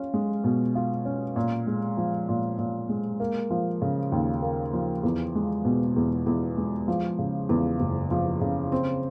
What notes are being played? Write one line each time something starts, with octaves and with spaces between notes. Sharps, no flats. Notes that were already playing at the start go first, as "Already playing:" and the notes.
Already playing: C#4 F4
G#3
B2
F4
C#4
A#2
G#3
F3
A#2
A#2
G#3
A#3
F3
C#3
D#2
A#3
F3
E2
G#3
B2
E2
E2
G#3
F3
C#3
E2
F#1
F3
C#3
C4